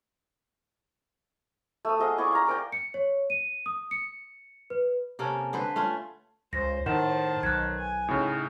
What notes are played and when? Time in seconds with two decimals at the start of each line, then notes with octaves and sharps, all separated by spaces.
1.85 A3 D#6
1.99 G#4 D#5 F5 F#5
2.18 E4 G#4 D5 C#6
2.32 F5 A#5
2.47 A#4 D5 G5
2.72 C#7
2.94 C#5
3.30 D#7
3.66 D#6
3.91 C#7
4.70 B4
5.19 C3 A#3 C#4 A4
5.53 D3 A4 B4 C5
5.76 A3 C#4 F4
6.53 C#2 C5 A#6
6.86 A2 D#3 C5 F#5 A5 E7
7.43 B1 F#6 G#6
7.78 G#5
8.08 A2 C#3 D#4